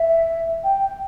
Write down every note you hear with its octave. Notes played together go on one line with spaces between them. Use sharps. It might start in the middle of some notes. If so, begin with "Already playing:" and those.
Already playing: E5
G5